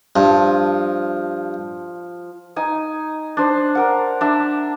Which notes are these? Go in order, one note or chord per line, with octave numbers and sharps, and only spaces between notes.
G2 F3
D#4 G#5
D4 C5
D4 A#4 F#5
D4 E5